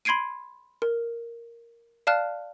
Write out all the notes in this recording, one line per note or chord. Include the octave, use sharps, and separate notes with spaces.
B5 C6 G#6 C7 D7 D#7
A#4
D5 F5 A5 F6 F#6